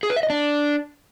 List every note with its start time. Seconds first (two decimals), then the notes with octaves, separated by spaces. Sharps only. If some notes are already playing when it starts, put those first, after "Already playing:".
0.03 G#4
0.10 B4
0.16 E5
0.23 D#5
0.30 D4